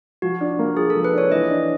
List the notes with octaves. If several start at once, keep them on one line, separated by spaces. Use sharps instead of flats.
F3 F#4
D4
A#3
F3 G#4
A4
F3
B4
D4 C#5
E3 D#5
D4